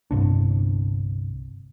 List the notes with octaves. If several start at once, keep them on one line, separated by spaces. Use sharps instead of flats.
G1 C2 D4